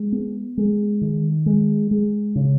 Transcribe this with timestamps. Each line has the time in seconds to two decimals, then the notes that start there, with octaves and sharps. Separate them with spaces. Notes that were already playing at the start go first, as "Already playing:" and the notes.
Already playing: G#3
0.12 B3
0.57 G#3
1.01 D#3
1.46 G#3
1.91 G#3
2.35 C#3